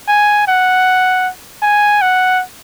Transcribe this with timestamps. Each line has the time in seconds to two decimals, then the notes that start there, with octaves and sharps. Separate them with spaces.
0.08 G#5
0.47 F#5
1.62 G#5
2.02 F#5